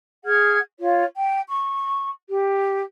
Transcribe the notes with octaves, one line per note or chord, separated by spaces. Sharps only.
G#4 F#5 F6 G#6
F4 C#5
G5
C#6
G4